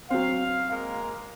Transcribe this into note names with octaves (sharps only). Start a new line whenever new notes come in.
F#3 C4 F5
G#3 A#3 A#4